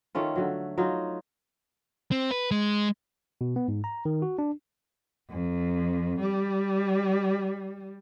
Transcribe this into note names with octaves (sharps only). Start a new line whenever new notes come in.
D#3 A3 C#4 F4
D3 F#3
F#3 D#4 F4
C4
B4
G#3
B2
B3
G#2
A#5
D#3
F#4
D4
F2
G3